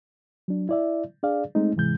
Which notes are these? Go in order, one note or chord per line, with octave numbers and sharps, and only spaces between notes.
F#3 D4
E4 D5 E5
D4 G#4 D5 F5
G#3 A3 C4 D#4
G#2 C3 E3 G#3 G6